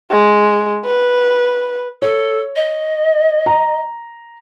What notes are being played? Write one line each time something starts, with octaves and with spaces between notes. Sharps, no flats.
G#3
B4
A4 C#5
D#5
A#5